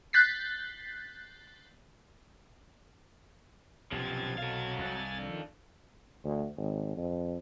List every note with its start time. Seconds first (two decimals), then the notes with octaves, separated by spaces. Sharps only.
0.13 F#6 G6 A6 B6 C7
3.92 B1 F#2 C3 F3 G4 G#6 A6
4.38 F#3 A4 F5
4.79 C2 G#5 A6
5.18 D#3 F3 D4
6.25 D2
6.57 G#1
6.97 F2